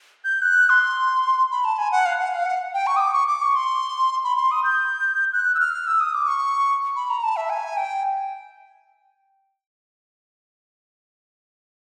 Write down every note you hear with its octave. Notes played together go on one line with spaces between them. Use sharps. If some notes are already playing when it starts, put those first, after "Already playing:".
G6
F#6
C6
B5
A5
G#5
F#5
F5
F#5
F5
F#5
G5
C#6
D#6
D6
C#6
D6
C#6
C6
B5
C6
D#6
G6
F#6
E6
F6
E6
D#6
D6
C#6
B5
A#5
A5
E5
G#5
G5